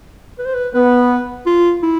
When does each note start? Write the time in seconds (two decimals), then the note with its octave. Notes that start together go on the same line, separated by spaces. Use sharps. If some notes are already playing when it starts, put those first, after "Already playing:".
0.39 B4
0.46 C5
0.54 B4
0.74 B3 B4
1.46 F4
1.83 E4